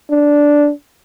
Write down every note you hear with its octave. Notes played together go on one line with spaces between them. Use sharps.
D4